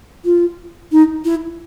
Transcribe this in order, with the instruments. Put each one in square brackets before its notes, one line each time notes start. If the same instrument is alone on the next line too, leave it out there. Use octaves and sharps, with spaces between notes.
[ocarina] F4
D#4
E4